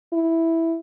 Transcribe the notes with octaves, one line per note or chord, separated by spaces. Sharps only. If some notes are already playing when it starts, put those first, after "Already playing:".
E4